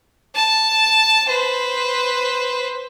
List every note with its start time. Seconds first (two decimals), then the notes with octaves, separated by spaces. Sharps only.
0.35 A5
1.29 B4 C5